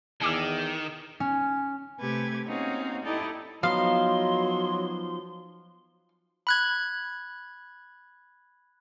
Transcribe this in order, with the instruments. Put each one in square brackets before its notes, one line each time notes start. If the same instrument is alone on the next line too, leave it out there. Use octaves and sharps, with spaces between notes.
[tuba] E2 [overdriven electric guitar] D#3 [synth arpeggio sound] G#5 D6 E6
[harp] C#4
[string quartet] C3 A3 G4 B4 G#6
A#3 C4 C#4 D#4 F#4 F5
D#4 E4 G4 A4 D5 D#5
[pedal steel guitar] F3 B3 D#4 [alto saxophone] F#3 [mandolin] F5 [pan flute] C6
[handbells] B5 F#6 G#6